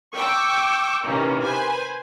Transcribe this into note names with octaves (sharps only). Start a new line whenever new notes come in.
G5 C#6 D6 E6
C3 D#3 E3 A#3 C#4
B4 C5 G#5